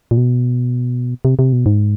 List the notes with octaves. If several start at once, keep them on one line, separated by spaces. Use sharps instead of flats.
A#2
B2
C3
C3
B2
G#2